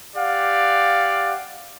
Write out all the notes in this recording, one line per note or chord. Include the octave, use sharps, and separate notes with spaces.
G4 D5 F5 F#5